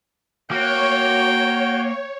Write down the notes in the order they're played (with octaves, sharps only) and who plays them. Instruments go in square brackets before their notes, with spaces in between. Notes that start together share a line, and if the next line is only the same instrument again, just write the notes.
[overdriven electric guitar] A#3 [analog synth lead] F#4 [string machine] C#5 [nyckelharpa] G5